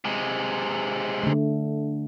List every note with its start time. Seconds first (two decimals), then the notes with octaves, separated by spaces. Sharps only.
0.05 C3 G#3
1.23 D3 A3